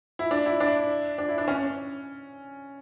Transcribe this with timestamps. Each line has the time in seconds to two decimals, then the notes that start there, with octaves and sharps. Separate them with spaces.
0.19 E4
0.31 D4
0.46 E4
0.60 D4
1.18 D4
1.29 E4
1.38 D4
1.48 C#4